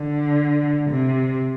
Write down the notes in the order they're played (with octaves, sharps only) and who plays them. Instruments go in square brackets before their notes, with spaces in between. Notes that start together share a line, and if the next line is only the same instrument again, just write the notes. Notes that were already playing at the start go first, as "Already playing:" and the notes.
Already playing: [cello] D3
C3